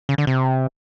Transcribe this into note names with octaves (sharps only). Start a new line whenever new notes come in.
C#3
D3
C3